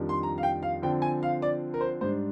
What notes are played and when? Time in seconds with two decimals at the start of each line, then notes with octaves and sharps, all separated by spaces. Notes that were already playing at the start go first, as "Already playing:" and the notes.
Already playing: F2 D#3 G3 D4
0.09 C6
0.23 A#5
0.38 F5
0.43 G5
0.63 F5
0.82 D3 F3 C4 G5
1.02 G#5
1.23 F5
1.42 D5
1.74 A#4
1.81 C5
2.01 G#2 G3 D4 C5